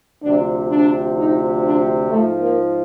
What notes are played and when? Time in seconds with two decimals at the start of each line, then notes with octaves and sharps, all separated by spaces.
0.22 D2 C3 F3 D4
0.70 D4
1.16 D#4
1.63 D4
2.09 G#2 F3 A3
2.40 A#3